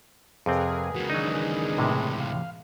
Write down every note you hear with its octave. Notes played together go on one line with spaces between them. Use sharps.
F2 C3 C4 G#4 A#4 B4
C#2 E3 F#4
D#3 F#3 D4 D#4 D#5
A2 C3 G#3
F5